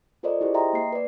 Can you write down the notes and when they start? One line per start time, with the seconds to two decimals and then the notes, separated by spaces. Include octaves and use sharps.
0.23 F4 A4 A#4 C5 D5 D#5
0.41 E4 G4 G#4 C5
0.54 D#5 E5 G5 A#5 C6
0.73 A#3 C7
0.92 B4 D5